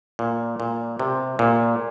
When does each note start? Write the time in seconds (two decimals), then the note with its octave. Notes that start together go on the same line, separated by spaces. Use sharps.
0.19 A#2
0.60 A#2
0.99 C3
1.39 A#2